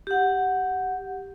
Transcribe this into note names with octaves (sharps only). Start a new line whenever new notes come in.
G4 F#5